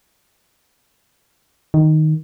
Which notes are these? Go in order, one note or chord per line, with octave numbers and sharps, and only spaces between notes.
D#3